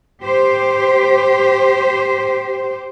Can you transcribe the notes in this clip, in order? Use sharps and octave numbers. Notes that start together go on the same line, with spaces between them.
G4 C5